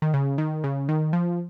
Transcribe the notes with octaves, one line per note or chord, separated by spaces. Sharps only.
D#3
C#3
D#3
C#3
D#3
F3